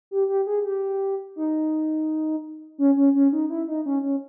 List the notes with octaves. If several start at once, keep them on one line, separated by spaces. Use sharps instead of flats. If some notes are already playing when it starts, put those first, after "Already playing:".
G4
G4
G#4
G4
D#4
C#4
C#4
C#4
D#4
E4
D#4
C#4
C#4